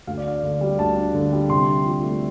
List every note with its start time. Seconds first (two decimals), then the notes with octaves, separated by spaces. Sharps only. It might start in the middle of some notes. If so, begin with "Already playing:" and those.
0.07 D2 F5
0.17 D5
0.25 D4 F5
0.43 D3
0.61 G3
0.78 D2 A5
0.96 D4
1.14 D3
1.33 G3
1.50 C3 C6
1.68 D4
1.86 F3
2.03 A3